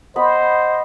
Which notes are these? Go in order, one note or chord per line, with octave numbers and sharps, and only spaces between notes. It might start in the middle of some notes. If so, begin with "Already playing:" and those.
B3 C5 D#5 B5